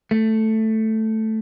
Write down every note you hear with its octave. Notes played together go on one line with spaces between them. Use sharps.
A3